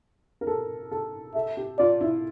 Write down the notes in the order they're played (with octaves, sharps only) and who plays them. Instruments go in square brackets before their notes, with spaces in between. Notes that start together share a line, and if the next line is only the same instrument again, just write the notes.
[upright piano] A#4
A4
A4
[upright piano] A4 [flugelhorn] E5
[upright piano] G4
[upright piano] F4 [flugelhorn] D5
[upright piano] E4